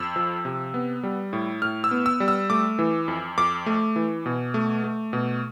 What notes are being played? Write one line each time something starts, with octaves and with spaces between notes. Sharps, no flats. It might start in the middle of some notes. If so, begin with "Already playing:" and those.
Already playing: F2 E6
F3
C3
B3
G3
A2
A2 F6
E6
B3
E6
G3
E6
A3 D6
E3
F2
F2 D6
A3
E3
B2
A3
A3
B2